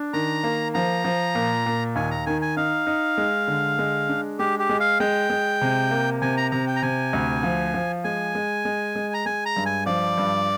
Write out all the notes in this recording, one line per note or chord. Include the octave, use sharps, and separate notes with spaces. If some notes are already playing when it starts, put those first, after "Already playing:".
Already playing: D4
D#3 A#5
A#3
F3 A#5
F3
A#2
A#2
D#2 G#5
A#5
D#3 G#5
G#5
D#4 F5
D#4
G#3
D3
G#3
D4
G#3 G4
G4
G#3
F5
G#3 G5
G#3
C3
A#3
C3 G#5
A#5
C3 A#5
G5
A#5
C3 G#5
D2
F3
F3
G#3 G#5
G#3
G#3
G#3
A#5
G#3 G#5
A#5
G2
G#5
F3 D5
G2